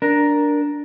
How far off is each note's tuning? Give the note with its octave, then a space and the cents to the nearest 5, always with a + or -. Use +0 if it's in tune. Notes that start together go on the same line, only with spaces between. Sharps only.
D4 -5 A#4 +5